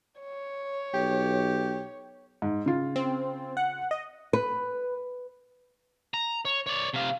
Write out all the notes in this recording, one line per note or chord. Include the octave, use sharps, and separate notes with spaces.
C#5
B1 G4
G#2
C#3 F4
C4
F#5
D#5
B4
A#5
C#5
C#5 D5
C3 F5